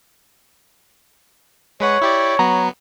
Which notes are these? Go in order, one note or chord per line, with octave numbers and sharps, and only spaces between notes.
G#3 B4 C#5 F#5
E4 G4 D5
F#3 B3 A#5